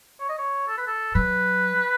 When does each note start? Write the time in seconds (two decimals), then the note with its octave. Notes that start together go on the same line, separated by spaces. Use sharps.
0.20 C#5
0.29 D#5
0.38 C#5
0.68 A4
0.77 B4
0.87 A4
1.14 F#3 B4